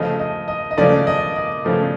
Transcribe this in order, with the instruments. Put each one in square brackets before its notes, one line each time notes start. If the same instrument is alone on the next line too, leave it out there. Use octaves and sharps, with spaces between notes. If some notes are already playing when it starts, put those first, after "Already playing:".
Already playing: [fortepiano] C#3 F3 A3 [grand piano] D#5
[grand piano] D#5
D#5
D#5
[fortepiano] C#3 F3 A3 [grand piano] D5
[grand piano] D#5
D#5
[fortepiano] C#3 F3 A3